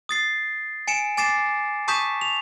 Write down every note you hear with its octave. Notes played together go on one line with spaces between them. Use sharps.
D#6 A6 C7
G#5 C#7 D7 E7
G#5 D6 A6 C7 E7
A5 C#6 D#6 G6 B6 E7
F7